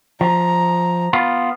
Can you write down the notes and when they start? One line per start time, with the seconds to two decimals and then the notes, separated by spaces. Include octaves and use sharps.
0.21 F3 A#5
1.13 B3 F4